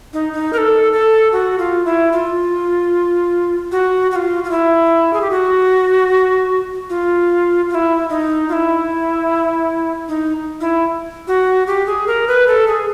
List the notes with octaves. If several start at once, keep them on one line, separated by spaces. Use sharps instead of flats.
D#4
D#4
A#4
A4
A4
F#4
F4
E4
F4
F#4
F#4
F4
F4
E4
G#4
G4
F#4
F4
F4
E4
D#4
F4
E4
D#4
E4
F#4
G4
G#4
A#4
B4
A4
G#4